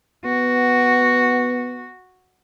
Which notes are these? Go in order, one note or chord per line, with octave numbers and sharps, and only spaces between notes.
B3 F#4